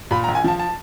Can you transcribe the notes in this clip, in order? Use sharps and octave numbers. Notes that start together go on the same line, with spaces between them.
A#2 B5
A#5
A#1
G#5
F3 A5
A5